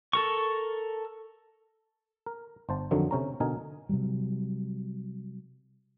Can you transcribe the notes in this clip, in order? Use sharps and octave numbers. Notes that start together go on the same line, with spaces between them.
A4 A#4 C#6
A#4
G1 C5 A5
F2 D3 D#3 F3 F#3
C3 C#4 A#5
B2 D3 D#4 A#4 G#5
C3 F#3 G3